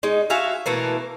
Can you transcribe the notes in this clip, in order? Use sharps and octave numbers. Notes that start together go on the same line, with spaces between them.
G#3 D#4
F#4 E5 F5 G#5
B2 E3 A3 A#3